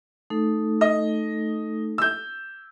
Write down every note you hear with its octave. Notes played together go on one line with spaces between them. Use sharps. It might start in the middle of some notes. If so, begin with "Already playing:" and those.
A3 D#4 A4
D#5
E6 G6